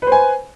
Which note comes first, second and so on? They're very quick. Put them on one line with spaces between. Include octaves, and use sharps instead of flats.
B4 C5 G#5